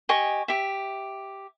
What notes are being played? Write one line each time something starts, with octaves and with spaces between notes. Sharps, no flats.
G4 D#5 G#5 C#6
G4 E5